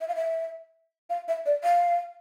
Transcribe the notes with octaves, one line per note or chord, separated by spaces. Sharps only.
E5
F5
E5
F5
E5
D5
F5